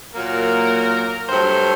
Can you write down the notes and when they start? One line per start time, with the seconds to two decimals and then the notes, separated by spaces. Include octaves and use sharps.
0.15 A#2 F#3 A#3 A#4
1.29 G2 F#3 A3 C5